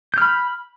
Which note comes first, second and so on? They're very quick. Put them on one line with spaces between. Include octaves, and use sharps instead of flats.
G6 F6 B5